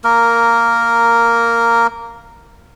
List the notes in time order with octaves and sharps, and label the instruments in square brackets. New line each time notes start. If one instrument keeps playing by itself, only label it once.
[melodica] A#3 A#4